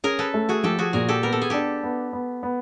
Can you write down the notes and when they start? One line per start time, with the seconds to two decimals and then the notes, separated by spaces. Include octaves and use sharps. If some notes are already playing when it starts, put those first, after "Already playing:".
0.04 C#4 G#4 A#4
0.19 A4 B4
0.34 A3
0.49 F#4 G#4
0.64 F3 G4 A4
0.79 F#4 G#4
0.93 A#2 G#4 A#4
1.08 G4 A4
1.23 B3 A#4
1.32 A4
1.42 G#4
1.50 D4 G4 A4
1.83 B3
2.13 B3
2.43 B3